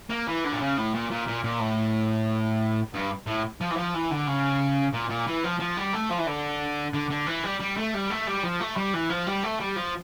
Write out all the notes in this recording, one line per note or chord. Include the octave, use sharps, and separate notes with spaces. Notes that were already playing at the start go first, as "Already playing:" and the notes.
A#3
E3
D3
A#2
C#3
A2
A#2
A#2
A#2
A#2
A2
G2
A2
F3
E3
F3
E3
D3
C#3
A#2
A#2
E3
F3
F3
G3
A3
F3
E3
D3
D3
D3
E3
G3
G3
A3
G3
A3
G3
F3
A3
G3
E3
F3
G3
A3
G3
F3